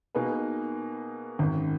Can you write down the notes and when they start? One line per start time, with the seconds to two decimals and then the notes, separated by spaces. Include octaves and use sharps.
0.15 B2 A#3 D#4 G#4 B4
1.39 G#1 F#2 D#3